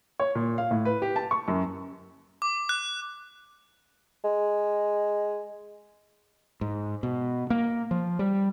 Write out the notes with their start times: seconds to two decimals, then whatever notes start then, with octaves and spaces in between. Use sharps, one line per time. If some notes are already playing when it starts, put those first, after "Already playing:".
0.20 C#5
0.35 A#2
0.58 F5
0.71 A2
0.85 B4
1.02 G4
1.16 A5
1.31 C#6
1.48 F#2
2.42 D6
2.69 F#6
4.24 G#3
6.61 G#2
7.03 B2
7.50 A#3
7.91 F3
8.19 G3